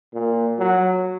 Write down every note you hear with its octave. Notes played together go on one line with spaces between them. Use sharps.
A#2
F#3